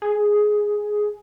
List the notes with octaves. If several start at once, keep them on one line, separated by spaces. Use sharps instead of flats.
G#4